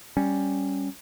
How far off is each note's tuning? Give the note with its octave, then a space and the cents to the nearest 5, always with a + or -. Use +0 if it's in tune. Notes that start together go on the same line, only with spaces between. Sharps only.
G3 +0 C#4 +0